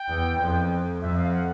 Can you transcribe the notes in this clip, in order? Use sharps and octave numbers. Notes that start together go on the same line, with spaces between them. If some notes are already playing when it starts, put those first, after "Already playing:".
Already playing: G5
E2
F2
F2 E5
F5
F#5